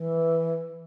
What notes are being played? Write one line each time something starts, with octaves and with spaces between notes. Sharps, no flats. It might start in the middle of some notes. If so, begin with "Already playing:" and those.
Already playing: E3